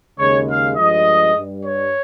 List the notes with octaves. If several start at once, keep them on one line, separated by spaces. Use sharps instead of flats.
D#2 C#3 G#3 C#5
F5
G2 F3 G#3 D#5
G2 G3
C#5